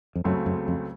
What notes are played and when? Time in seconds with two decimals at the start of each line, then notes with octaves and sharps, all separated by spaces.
0.15 F2
0.24 C#2 F#2 C#3 F#3 A3 C4
0.46 F#2
0.68 F2